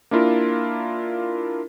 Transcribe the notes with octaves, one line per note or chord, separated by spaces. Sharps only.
A#3 D4 E4 F4 A#4